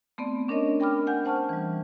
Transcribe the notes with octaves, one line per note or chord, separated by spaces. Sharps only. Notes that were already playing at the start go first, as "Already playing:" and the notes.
A3 B3 C4 D5
C#4 D4 A#4 C#5 D#5
A#4 G5 B5 D6 F6
F#5 G#5 G6
C5 F#5 A5 C#6 F6
E3 G3